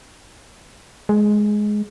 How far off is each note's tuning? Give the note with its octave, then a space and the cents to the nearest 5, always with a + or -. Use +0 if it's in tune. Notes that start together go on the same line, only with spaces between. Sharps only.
G#3 +10